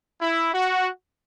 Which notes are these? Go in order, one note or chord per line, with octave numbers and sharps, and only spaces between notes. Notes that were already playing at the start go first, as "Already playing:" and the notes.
E4
F#4